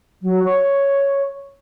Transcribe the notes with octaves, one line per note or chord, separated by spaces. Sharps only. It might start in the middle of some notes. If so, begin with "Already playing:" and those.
F#3
C#5